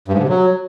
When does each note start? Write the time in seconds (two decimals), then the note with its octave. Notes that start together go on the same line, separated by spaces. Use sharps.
0.08 G2
0.13 G#2
0.18 D3
0.24 C3
0.29 F#3